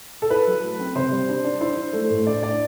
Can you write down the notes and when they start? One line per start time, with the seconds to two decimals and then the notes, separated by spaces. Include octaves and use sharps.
0.22 A4
0.30 E4 B4
0.47 F#3
0.62 A3
0.79 C4
0.95 C3 C5
1.11 G3
1.29 D4
1.44 D4
1.61 E4 C5
1.77 E4
1.93 A3
2.10 A2
2.26 D4 D5
2.42 D4 D5